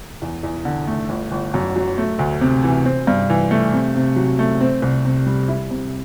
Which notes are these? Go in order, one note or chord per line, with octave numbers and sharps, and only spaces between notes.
E2
E2
D3
A3
G1
G1
F#2
F#3
A3
D2
C3
E3
C4
G2
E3
A3
C3
C3
F#3
A3
C4
C2
C3
G3
E4
C3